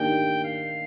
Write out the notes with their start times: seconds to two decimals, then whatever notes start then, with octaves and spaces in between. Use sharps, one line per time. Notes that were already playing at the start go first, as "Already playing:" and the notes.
Already playing: D#3 A#3 D4 G4 G5
0.44 F5